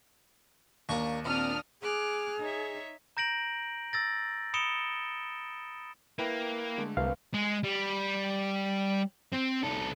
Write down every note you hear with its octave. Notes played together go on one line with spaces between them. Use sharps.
D#2 A#3 D4 C#6
A#2 C4 D4 D#6 F6
G#4 D6 F6 F#6
D#4 C#5 E5
A#5 G6 A#6 D7 F#7
E6 A6 A#6
B5 D#6 C#7 D7 E7 G7
A#3 E4 B4 G5
D3 G#3 A3
C2 B4 F5
G#3
G3
C4
C2 A4